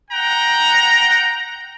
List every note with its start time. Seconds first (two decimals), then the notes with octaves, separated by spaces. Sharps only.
0.11 F#5 G5 A#5